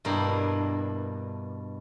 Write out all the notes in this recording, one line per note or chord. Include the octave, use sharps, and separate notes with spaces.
G2 B2 A#3 D4 E4